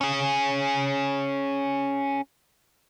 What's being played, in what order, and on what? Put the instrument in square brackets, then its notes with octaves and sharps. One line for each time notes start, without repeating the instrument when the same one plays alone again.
[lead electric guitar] C#4 G#4